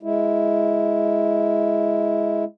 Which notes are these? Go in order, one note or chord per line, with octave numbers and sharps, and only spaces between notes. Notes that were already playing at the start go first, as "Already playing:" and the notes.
G#3 E4